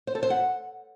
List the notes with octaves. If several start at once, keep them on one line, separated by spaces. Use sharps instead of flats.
C5
A4
C5
F#5